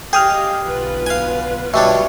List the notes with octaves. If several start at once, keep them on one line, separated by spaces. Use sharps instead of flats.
G4 G#4 D#5 F5 G5 D#6 F6
B1 D3 B3 F4 B4
F5 G#5
B2 G3 D4 F4 C#5 E5